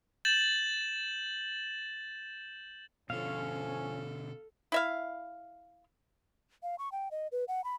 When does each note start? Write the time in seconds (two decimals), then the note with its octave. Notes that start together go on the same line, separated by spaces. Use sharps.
0.25 G6 A6 E7 F#7
3.10 B2 D3 F3 C#4 A4 F5
4.72 E4 E5 F5
6.63 F5
6.79 C#6
6.92 G5
7.11 D#5
7.32 B4
7.48 F#5
7.64 B5